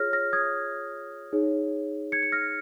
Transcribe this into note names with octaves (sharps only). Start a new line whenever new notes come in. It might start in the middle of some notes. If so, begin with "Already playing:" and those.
Already playing: F4 G#4 C#5 F6 A#6
F6 A#6
D#6 G#6
D#4 G#4 C#5
G#6 C#7
C#7
F6 A#6